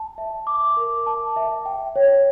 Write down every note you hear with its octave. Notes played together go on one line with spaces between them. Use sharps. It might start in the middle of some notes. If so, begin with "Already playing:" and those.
Already playing: A5
E5
D6
A#4
A5
E5
G5
C#5